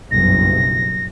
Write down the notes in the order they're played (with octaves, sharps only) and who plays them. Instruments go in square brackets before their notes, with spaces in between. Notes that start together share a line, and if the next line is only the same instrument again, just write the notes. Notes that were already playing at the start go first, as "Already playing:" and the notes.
[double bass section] F#1 B1 G2 [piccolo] A#6